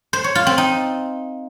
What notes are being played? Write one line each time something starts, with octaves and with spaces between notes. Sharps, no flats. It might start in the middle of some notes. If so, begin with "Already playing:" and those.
C5
C#5
F4
C4
D#4